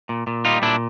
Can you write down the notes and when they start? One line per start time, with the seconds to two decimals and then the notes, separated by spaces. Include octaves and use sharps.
0.09 A#2
0.27 A#2
0.45 G3 D#4 F4
0.62 A#2 D4 E4